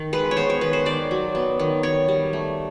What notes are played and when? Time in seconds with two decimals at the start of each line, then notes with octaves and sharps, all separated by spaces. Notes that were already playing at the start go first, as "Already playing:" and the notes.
Already playing: D#3
0.13 G#3 B4
0.31 C#5
0.37 B3 C5
0.50 C#5
0.61 D#3 B4
0.73 C5
0.86 D#3 D5
1.11 F#3
1.35 B3
1.60 D#3
1.83 D#3 C#5
2.08 G3
2.33 A3